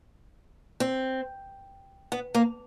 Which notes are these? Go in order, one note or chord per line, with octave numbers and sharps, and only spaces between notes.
C4
B3
A#3